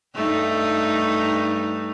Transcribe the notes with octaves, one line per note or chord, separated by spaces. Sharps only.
G2 A3 D#4